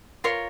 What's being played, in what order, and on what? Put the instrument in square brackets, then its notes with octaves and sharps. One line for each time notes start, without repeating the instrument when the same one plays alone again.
[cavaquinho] F4 A#4 C#5 C6